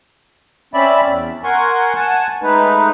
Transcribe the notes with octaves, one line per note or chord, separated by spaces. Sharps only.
C4 C#4 D5 E5 B5
E2
A#4 F#5 G#5 C6 C#6
F#5 G#5 A5
G#3 A3 D#4 B4